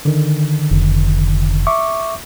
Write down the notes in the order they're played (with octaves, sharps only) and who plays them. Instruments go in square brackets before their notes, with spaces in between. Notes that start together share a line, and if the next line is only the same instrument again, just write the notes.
[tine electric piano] D3 D#3
[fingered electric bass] F1
[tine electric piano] E5 C#6 D6